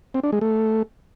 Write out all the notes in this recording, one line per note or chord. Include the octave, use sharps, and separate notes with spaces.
C4
D4
G#3
A3